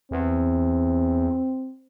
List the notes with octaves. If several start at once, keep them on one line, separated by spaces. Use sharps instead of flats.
E2 C4